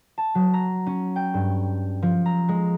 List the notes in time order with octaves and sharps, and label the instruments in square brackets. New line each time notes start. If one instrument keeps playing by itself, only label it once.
[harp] A5
F#3
A#5
C#4
G5
G2
F3
A#5
G#3